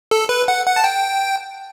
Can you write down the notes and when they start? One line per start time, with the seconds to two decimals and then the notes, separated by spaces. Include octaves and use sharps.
0.11 A4
0.29 B4
0.48 F#5
0.67 F#5
0.76 A5
0.84 G5